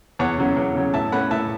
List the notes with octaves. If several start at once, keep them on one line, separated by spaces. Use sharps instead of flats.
E2 C#5 F#5
C#3 F#3 C#4
E2
C#3 F#3 C#4
A2 E5 A5
A3 C#4 F#5 B5
A2 E5 A5